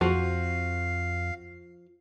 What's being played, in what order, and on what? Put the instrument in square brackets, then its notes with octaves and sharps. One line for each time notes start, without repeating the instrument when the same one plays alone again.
[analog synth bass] F2 [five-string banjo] F3 [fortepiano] F#4 [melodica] F5